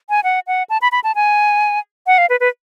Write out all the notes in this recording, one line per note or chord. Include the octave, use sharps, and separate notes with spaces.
G#5
F#5
F#5
A5
B5
B5
A5
G#5
F#5
F5
B4
B4